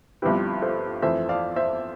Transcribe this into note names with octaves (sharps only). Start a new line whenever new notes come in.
G1 G2 F3 C4 E4 G4 B4
A4 C5
F2 E3 A3 C5 E5
D5 F5
C5 E5